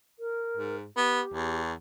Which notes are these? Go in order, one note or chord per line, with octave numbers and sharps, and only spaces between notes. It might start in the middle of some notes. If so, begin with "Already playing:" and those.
A#4
G#2
B3 G4
E2